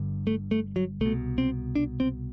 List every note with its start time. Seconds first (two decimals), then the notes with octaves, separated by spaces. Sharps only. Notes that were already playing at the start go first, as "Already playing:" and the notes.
Already playing: G1 G2 D3
0.27 A3
0.51 A3
0.76 F#3
1.01 C2 B2 A3
1.38 C4
1.75 D4
2.00 C4